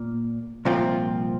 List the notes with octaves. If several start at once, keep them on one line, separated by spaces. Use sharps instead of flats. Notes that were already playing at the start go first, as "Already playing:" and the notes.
Already playing: A#2 A#3
C2 A#2 F3 C4 F4